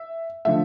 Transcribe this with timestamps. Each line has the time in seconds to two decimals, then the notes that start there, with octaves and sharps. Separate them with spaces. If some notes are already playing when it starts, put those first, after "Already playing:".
Already playing: E5
0.45 D3 F3 A3 E5